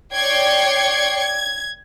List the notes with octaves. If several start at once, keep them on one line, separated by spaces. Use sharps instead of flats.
C#5 D5 G5 G#6 C7 C#7
G#6